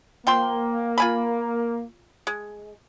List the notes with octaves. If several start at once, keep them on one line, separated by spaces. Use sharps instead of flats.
F3 A#3 G5 C6
F4 G#5 B5
G#3